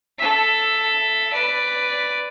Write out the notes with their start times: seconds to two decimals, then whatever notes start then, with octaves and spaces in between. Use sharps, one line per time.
0.18 A4 E5
1.32 B4 D5